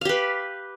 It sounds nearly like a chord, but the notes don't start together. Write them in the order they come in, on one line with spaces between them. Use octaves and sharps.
F5 G4 B4